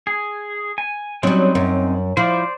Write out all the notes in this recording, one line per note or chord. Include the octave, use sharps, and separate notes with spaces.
G#4
G#5
F#3 G3 C4 C#4 D#4
F#2
F3 E4 C5 D5